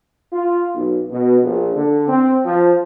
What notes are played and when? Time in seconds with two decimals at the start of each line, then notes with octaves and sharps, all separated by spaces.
0.33 F4
0.75 B1
1.10 B2
1.43 A#1
1.75 D3
2.07 C4
2.43 F3